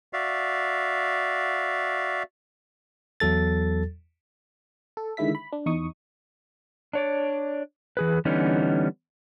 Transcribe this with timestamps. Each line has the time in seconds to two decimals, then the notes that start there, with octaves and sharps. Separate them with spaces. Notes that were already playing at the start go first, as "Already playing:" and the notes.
0.13 F#4 D5 E5 F5
3.20 E2 F#3 A4 A6
4.97 A4
5.17 D3 D#3 G#3 E4 E5 B6
5.35 B5
5.53 D4
5.66 E2 D#4 C#6 D#6
6.93 D4 C#5 D5
7.97 E3 G#4 B4
8.25 D3 E3 G3 B3 C#4 D#4